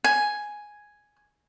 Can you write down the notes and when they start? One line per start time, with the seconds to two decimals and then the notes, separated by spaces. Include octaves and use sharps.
0.04 G#5